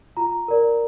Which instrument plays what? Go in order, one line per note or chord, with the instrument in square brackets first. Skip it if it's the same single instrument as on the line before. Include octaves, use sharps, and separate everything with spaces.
[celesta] F4 A#5
A#4 D5